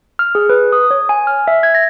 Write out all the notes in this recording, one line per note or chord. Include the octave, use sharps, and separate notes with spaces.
F6
G#4
B4
D#6
C#5
G#5
F6
E5
G#6
A#6